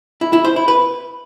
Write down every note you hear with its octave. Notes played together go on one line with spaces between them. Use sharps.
E4
E4
C5
E4
B4